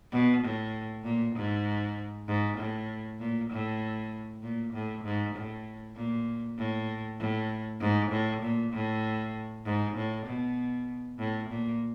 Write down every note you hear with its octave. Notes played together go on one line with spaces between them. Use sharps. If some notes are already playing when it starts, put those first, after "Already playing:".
B2
A2
A#2
G#2
G#2
A2
A#2
A2
A#2
A2
G#2
A2
A#2
A2
A2
G#2
A2
A#2
A2
G#2
A2
B2
A2
A#2